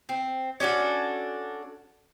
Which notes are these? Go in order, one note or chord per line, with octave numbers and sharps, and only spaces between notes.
C4
C#4 D4 F#4 A4